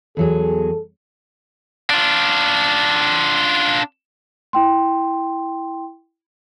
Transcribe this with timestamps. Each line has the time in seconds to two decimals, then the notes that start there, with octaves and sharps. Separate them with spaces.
0.17 E2 F#3 G#4 A4
1.90 D4 F4
4.53 E4 G5 C6